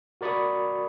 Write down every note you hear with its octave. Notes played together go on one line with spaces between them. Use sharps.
F#4 A#4 D5 B5 C#6 D#6